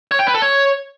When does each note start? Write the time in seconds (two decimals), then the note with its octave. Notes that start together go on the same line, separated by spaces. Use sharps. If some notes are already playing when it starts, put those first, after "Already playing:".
0.11 C#5
0.19 G5
0.27 B4
0.34 A4
0.42 C#5